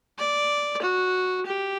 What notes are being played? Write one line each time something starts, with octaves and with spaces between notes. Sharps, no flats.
D5
F#4
G4